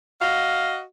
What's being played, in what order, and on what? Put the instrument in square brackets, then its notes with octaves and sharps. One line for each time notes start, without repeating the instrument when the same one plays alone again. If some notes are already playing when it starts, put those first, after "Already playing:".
[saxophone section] F#4 D#5 F5